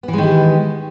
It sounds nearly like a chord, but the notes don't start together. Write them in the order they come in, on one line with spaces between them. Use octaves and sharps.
B3 E3 G#3 D#3 G4